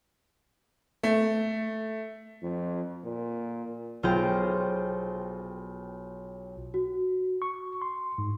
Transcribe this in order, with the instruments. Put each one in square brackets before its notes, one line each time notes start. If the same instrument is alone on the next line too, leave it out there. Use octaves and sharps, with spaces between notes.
[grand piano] A3
[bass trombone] F2
A#2
[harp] B1 F4 G#4 C5 G5
[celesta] F#4
[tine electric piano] C#6
C6
G#2